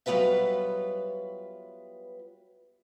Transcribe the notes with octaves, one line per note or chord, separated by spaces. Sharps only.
F#3 G3 B3 F4 B4 E5